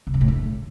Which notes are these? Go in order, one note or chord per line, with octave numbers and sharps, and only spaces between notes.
C3
F#2
A2
D3